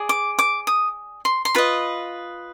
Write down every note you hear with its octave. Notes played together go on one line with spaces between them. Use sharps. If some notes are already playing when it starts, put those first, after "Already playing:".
Already playing: G#4 D5
D6
D6
D#6
C6
C6
F4 B4 D#5 B5